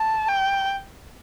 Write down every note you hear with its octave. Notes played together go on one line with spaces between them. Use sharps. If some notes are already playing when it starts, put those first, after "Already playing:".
Already playing: A5
G5